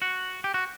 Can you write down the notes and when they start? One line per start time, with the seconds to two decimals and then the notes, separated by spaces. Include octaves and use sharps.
0.02 F#4
0.44 G4
0.54 F#4